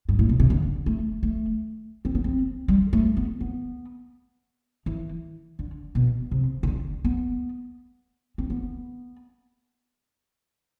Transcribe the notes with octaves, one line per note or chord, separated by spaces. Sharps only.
G2
A2
B2
C3
D3
A3
A3
C4
B3
C4
G3
A3
B3
B3
E3
D3
B2
C3
C3
D3
B3
C4
B3